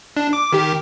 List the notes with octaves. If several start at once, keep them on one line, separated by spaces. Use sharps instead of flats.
D4
D6
D#3 G4